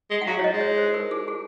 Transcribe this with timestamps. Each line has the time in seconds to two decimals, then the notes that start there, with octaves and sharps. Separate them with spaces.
0.10 G#3
0.22 F#5
0.27 F#3 F5
0.39 C#5
0.44 D#5
0.52 G#3
0.61 C#5
0.78 C5
0.94 A#4
1.11 G#4
1.28 G#4